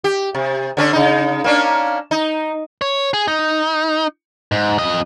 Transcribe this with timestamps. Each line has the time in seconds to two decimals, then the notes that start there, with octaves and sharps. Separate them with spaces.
0.04 G4
0.35 C3
0.77 D3 C#4 D4
0.93 C#3 D#4
1.44 A#3 C#4 D4
2.11 D#4
2.81 C#5
3.14 G#4
3.28 D#4
4.52 G#2
4.79 F2 D#5